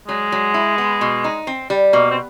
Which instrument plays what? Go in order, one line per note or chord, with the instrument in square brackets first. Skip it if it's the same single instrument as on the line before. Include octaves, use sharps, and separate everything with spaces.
[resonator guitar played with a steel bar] F#3 [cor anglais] G#3
[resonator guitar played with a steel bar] F#3
E4
B3
B2
D#4
C4
G3
[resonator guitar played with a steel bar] B2 [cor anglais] A#3
[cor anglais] C4